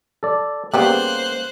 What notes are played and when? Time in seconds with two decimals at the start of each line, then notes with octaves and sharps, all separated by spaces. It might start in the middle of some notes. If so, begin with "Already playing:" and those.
0.23 A4 D5
0.74 C#3 G3 A#3 B3 C5 F#6